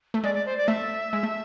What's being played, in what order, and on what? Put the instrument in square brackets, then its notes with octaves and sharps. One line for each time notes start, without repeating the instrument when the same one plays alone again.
[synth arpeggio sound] A3
[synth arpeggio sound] G#3 [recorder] D5
[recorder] D5
C5
D5
[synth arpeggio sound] A3 [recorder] E5
[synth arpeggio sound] G#3
A3